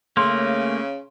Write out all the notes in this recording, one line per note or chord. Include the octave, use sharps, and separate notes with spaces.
C#3 A3 A#3 C6